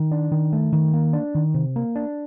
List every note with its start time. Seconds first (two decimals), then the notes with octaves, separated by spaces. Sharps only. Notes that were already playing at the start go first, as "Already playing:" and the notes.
Already playing: D#3
0.11 D4
0.32 D#3
0.53 A3
0.73 D#3
0.93 A#3
1.13 D4
1.35 D#3
1.54 C3
1.76 A#3
1.96 D4